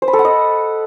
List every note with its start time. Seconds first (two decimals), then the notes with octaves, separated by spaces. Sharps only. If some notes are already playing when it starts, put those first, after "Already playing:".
0.02 C5
0.08 B5
0.13 A4
0.19 F#5
0.25 D#5